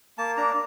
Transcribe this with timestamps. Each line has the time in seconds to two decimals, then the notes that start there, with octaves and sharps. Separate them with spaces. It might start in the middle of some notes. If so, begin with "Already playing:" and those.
0.18 A#3 A5
0.37 D4 A#5